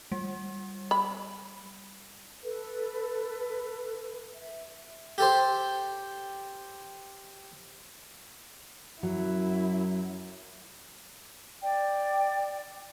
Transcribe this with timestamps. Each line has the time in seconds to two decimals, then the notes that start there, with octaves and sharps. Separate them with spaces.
0.12 G3
0.91 B5
2.43 A4 B4
4.35 E5
5.18 G4 A4 C5
9.03 F#2 F#3 E4
11.61 D5 G5